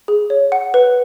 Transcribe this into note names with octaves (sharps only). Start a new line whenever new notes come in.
G#4
C#5
F#5
B4